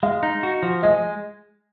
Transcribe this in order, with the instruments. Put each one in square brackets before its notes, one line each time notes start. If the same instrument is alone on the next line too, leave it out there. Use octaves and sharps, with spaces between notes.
[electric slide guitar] G#3 [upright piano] F5
[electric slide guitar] D#4
F#4
F3
[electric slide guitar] G#3 [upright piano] D#5